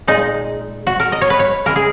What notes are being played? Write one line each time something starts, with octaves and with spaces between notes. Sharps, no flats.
A#2 G#3 D#4
F#4
A#4
D#5
C#5
B4
C#5
C#3 E3 G#3 A#4
G#4